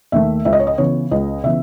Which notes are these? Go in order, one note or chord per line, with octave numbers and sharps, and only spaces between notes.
D#2 D#3 A3 E5
C#2 E5
D#5
C#5
D#5
C#3 E3 B3 C#5
C#2 D#5
C#3 E3 B3 E5